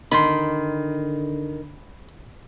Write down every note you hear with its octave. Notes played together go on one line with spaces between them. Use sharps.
D3 D#3 B5 C6